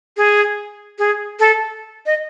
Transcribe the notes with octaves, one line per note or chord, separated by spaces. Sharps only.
G#4
G#4
A4
D#5